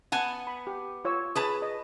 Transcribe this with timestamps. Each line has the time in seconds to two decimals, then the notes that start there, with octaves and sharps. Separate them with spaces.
0.12 B3 F#5 G#5 A5
0.47 B5
0.67 G4
1.05 F4 C#5 E6
1.35 G#4 B4 A5 D#6
1.62 D#5